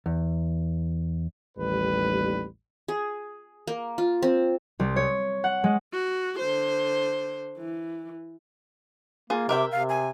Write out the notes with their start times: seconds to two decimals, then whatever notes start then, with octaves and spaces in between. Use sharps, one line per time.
0.06 E2
1.58 A1 D#2 G3 B4
2.88 G#4
3.67 A#3
3.98 F4
4.23 C4
4.80 C2
4.96 C#5
5.44 F#5
5.64 G#3
5.93 F#4
6.39 D3 C5
7.58 E3
9.30 A#3 F4 G#4
9.49 C3 A#4 E5 G5 D6
9.72 C3 F5
9.89 G#5